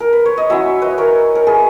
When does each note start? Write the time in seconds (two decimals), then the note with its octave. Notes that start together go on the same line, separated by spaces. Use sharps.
0.00 A#4
0.13 B4
0.26 C#5
0.38 D#5
0.50 F#3 C#4 E4 C#5 E5
0.82 B4 D#5
0.98 A#4 C#5
1.35 A#4
1.47 G#4 B4